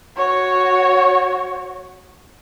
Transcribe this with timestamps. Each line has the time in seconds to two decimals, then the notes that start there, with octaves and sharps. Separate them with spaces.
0.16 F#4 C#5